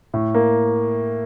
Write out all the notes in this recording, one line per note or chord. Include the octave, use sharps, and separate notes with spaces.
A2
A#3